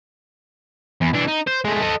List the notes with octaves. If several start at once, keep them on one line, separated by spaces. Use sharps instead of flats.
E2
E3 D4
D#4
C5
G#3 A3
A4 D#5